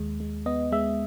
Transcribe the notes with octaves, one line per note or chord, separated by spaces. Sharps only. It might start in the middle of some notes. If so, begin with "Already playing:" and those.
Already playing: D#2 G#3
G#3
B3 D#5
G#3 E5